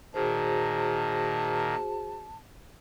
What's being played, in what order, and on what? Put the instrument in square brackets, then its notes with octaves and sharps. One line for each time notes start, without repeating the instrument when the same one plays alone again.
[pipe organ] A#2 D#3 [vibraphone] F#4 G#4 C5 [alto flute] A5